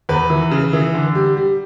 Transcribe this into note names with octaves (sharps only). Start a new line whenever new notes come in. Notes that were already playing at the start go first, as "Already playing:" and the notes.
E2 B4
E3
C#3
E3
D3
G3
G3